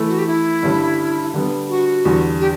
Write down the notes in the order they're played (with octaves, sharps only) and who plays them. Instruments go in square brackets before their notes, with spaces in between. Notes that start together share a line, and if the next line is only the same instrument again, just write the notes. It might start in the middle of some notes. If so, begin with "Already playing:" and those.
Already playing: [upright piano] E3 A3 E4 A4
[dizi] F#4
G4
E4
[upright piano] G2 D3 G3 C#4
D3 G3 B3
[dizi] F#4
[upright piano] E2 D3 G3
[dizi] G4